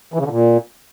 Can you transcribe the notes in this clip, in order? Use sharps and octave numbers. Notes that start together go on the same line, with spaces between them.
E3
C#3
D3
A#2